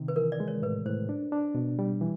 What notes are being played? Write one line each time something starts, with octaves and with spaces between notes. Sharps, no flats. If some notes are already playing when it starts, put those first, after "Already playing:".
Already playing: C3 D#3
B4
E3 A#4
D5
G#3
C#5
A2 B4
A2 C5
D4
D4
B2
G3
E3